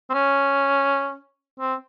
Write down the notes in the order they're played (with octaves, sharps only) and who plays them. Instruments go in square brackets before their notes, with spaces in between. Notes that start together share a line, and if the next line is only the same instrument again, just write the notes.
[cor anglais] C4
C#4
C4